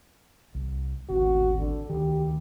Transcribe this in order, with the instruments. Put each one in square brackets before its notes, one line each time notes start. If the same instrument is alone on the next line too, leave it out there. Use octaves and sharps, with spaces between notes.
[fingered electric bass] C2
[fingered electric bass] D1 G#1 C4 [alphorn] F#4
[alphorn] D3
[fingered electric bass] D2 D#3 [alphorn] G4